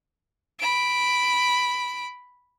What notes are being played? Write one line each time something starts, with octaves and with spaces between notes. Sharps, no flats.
B5 D7